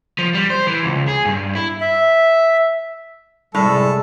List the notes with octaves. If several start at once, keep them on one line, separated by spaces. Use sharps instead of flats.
F3
G3
C5
E3
C#2
G#4
G2
E4
E5
F#2 A2 C3 G3 G#3 A4